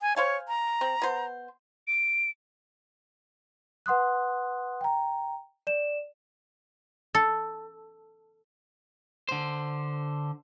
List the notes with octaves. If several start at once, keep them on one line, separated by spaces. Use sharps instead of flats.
G#5
C5 C#5 F5 G#5
A#5
C4
B3 C5
D7
B4 F#5 C6 D#6 F#6
G5 A#5
D5 E7
A4
D3 C5